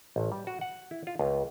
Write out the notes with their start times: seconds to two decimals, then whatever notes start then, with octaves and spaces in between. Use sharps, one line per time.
0.16 A1
0.32 G3
0.47 F#4
0.61 F#5
0.91 E4
1.07 F4
1.19 C#2